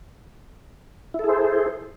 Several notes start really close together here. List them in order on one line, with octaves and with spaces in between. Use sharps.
E4 A4 G#4 C5